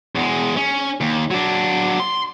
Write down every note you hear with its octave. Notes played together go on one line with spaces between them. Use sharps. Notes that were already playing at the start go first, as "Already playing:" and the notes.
E2 G#3
C#4
D#2
F#3 D4
C6